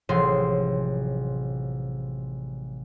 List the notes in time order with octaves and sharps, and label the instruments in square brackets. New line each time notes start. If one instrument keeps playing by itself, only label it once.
[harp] A1 C3 F3 F#3 G#4 C6